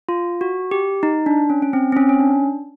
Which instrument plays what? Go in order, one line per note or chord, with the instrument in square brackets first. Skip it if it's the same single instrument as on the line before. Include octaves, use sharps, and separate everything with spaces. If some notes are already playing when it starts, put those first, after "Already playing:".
[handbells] F4
F#4
G4
D#4
D4
C#4
C#4
C4
C4
C#4
C#4
D4